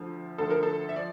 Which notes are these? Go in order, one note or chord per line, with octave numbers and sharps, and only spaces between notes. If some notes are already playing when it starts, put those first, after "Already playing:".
Already playing: D2 D3 F3
D2 D3 F3 A4
A#4
A4
E5
F3 D5